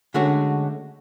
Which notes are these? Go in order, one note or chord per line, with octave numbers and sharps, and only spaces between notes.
D3 G#3 A3 C#4 F#4